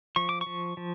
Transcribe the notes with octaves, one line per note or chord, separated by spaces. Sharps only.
F3 C#6
D6
C#6
F3
F3